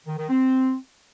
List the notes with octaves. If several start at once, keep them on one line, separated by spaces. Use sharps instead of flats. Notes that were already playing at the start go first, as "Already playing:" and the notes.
D#3
D#3
C4